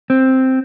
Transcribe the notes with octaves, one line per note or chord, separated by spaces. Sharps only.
C4